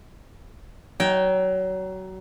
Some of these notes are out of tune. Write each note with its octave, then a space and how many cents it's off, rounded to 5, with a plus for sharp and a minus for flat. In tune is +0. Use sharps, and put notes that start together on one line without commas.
F#3 +25 G5 +0